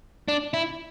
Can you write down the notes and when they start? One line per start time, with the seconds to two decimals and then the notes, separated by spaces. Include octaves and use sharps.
0.28 D4
0.54 E4